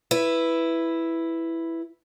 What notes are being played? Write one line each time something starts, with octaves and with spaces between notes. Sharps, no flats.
E4 B4